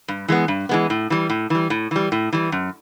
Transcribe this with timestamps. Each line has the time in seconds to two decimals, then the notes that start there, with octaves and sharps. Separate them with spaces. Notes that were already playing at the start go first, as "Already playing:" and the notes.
0.08 G2
0.28 E3 G#3 B3
0.48 G2
0.69 E3 G#3 B3
0.90 A2
1.10 E3 G3
1.30 A2
1.50 E3 G3
1.70 A2
1.91 E3 G3
2.12 A2
2.33 E3 G3
2.52 F#2